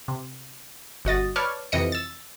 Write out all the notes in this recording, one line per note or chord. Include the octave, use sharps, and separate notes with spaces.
C3
G1 F#4 D#5 A6
B4 C#5 D5 A5 F6
F2 C3 E3 D#5 C#7
E6 A6